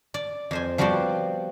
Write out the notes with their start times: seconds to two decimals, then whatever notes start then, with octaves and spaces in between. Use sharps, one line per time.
0.14 D5
0.51 F2 C5 G#5
0.78 F3 G3 B3 F#4 C5 D5